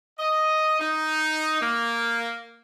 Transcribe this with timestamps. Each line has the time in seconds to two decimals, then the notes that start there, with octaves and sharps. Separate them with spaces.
0.19 D#5
0.80 D#4
1.62 A#3